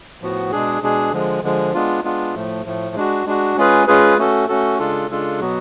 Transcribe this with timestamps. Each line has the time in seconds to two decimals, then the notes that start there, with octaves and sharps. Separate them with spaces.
0.21 A2 F3 B3 F#4
0.51 B2 G#3 D4 G#4
0.82 B2 G#3 D4 G#4
1.12 D3 F3 G#3
1.43 D3 F3 G#3
1.74 G#3 B3 D4 F4
2.04 G#3 B3 D4 F4
2.34 A2 F3 A3
2.65 A2 F3 A3
2.96 G#3 D4 F#4
3.26 G#3 D4 F#4
3.57 G#3 C#4 F4 G#4 B4
3.87 G#3 C#4 F4 G#4 B4
4.18 A3 C#4 F#4 A4
4.48 A3 C#4 F#4 A4
4.79 C#3 G#3 D4 F4 A4
5.09 C#3 G#3 D4 F4 A4
5.40 B2 F#3 B3 F#4